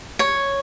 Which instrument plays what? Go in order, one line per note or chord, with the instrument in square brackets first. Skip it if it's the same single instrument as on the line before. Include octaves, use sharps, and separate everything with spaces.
[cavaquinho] C#5